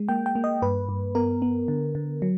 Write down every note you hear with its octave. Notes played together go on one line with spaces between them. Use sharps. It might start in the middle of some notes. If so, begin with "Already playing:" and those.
Already playing: G#3
A#3 G5
G5
A#3
D#5
G2 B4
G2
B3 A#4
B3
D3
D3
F#3